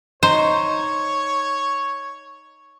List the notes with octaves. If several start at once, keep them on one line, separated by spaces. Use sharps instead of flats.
D#4 C5 C#5